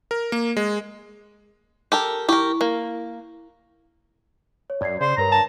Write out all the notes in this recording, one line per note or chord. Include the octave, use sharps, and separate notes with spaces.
A#4
A#3
G#3
G4 A4 A#4
E4 G4 A#4 C#6
A#3
C#5
F#2 D5 G#6 C7
C#3 C5 D5 C7
G2 A#4 B4 C#5 A#5
A5